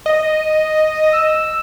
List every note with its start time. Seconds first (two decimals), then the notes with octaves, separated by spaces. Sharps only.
0.06 D#5
1.13 E6